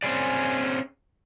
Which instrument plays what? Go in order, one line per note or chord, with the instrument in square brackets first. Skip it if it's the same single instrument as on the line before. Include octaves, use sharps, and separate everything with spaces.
[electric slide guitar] C4 C#4 G#4 D5